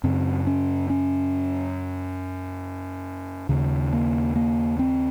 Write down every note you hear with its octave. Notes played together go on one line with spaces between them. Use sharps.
F#2 C#3 C4
C#4
C#4
D#2 C#3
A#3
A#3
C4